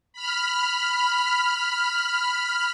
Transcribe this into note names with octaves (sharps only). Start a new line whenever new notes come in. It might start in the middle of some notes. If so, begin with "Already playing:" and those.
B5 F6